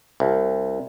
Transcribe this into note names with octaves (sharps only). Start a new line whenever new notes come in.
C2